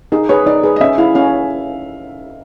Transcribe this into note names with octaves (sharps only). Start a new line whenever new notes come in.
D#4 G#4
G#4 B4 C#5
D#4 D5
G#4 B4
D#5
C#4 E5
E4 G#4 F5
C#4 F5